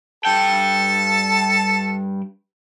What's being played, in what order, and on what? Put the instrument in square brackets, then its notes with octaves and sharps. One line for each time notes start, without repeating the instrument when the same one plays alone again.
[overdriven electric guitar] G2 G5 [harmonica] A4 A5